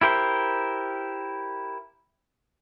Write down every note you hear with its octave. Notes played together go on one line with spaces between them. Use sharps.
E4 G4 A#4 C5